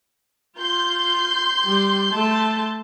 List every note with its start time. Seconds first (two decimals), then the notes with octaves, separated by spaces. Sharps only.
0.58 F4 C6 G6
1.64 G3
2.12 A3 A5